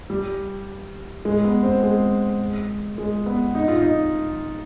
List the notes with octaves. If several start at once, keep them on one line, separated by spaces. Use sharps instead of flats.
G3
G#3
B3
C4
G#3
G#3
B3
D#4
F4
D#4